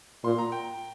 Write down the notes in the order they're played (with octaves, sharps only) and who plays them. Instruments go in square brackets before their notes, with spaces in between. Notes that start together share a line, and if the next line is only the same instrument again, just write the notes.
[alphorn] A#2 [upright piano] C6
[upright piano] A#5
G5